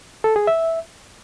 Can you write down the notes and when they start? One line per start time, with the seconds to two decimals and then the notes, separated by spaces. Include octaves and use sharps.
0.24 A4
0.36 G#4
0.47 E5